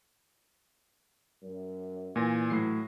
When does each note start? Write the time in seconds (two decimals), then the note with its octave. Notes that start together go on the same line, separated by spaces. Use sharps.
1.43 F#2
2.16 A#2 E3 G#5 A#6
2.50 A2 F#3 C7